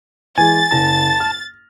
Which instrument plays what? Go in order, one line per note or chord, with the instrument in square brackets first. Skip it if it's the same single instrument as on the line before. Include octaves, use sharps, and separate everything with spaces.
[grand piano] E3 G#3 [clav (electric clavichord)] G#5 [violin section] A6
[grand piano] F#1 A#6 [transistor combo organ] A5
[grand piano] F6